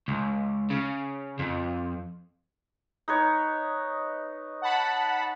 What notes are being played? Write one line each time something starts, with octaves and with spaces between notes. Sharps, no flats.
C#2
C#3
F2
D#4 B4 C#5
F#5 A5 B5